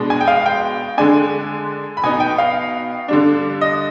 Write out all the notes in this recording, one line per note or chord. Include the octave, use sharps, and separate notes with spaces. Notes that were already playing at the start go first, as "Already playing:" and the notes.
Already playing: B2 G#3 D4
G#5
G5
F5
G5
D3 G#3 D4 G#5
B5
B2 B3 D#4 G#5
G5
F5
D3 G3 D4
D#5